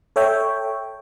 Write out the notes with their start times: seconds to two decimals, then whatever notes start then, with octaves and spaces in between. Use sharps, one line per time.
0.16 A4 C#5 E5 G5